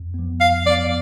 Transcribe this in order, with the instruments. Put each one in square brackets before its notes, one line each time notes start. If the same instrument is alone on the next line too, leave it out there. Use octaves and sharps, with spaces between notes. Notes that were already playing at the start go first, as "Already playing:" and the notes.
Already playing: [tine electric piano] F2
F3 B3
[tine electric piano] F2 [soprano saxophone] F5
[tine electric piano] F3 B3 [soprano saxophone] D5